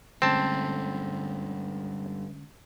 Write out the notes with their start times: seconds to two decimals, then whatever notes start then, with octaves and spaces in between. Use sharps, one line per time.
0.22 G2 D3 G#3 A3 C4 C#4 A5